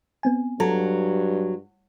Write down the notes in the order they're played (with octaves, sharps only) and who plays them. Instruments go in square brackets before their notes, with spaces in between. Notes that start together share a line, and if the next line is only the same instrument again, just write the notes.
[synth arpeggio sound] B3 C4 G#5
[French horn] G2 [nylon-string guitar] F#3 [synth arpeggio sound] A4 A5 A#5